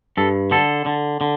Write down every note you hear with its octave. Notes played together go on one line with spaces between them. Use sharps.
G2 A4
D3 A4
D3
D3